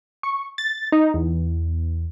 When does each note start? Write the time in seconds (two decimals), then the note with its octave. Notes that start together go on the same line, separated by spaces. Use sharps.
0.23 C#6
0.58 A6
0.92 D#4
1.14 E2